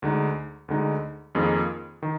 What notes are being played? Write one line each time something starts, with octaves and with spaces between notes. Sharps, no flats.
D2 D3 G#3 D#4
D2 D3 G#3 D#4
F2 D#3 A#3 F4 G#4
D#3